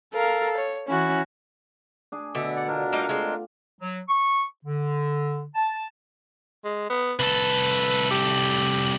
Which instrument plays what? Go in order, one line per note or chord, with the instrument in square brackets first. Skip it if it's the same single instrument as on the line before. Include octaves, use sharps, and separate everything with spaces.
[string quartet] A4 A#4 F5
C#5
E3 C#4 E4 F#4
[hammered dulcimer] D4 G#4
[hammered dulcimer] B2 [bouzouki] D3 [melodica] E5
[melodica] D5 F#5
[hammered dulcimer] B2 F4 [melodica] D4 A#4
[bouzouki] G3 A#3 D#4 [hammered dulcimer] A3
[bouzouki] G#3 C4
[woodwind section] F#3
C#6
D3
A5
[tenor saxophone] G#3
B3
[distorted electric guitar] C2 A4 [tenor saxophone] B4
[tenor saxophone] G4